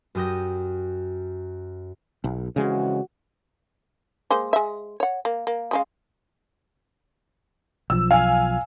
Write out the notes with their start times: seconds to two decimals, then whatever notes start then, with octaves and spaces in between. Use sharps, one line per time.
0.15 F#2 G4 D#6 G6 A#6
2.24 B1
2.56 F2 C#3 E3 G#3 F#4
4.30 G#3 A#3 C5
4.53 G#3 E5
5.00 C#5 F#5
5.25 A#3
5.47 A#3
5.71 C#3 G#3 F5
7.90 B1 F3 E6
8.11 F5 G#5